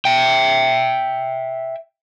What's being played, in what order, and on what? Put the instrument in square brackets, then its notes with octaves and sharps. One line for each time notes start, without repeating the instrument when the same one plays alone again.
[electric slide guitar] E5 G5